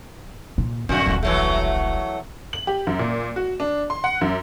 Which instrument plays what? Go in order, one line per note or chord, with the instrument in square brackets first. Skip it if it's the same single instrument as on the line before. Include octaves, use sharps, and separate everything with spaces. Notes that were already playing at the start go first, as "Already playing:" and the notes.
[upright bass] A#2
[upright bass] B1 G#2 [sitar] F2 D3 F#4
[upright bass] D#1 B1
[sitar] E3 F#3 A3
[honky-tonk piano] F#7
G4
F#2
A#2
F#4
D4
C6
F#5
F#2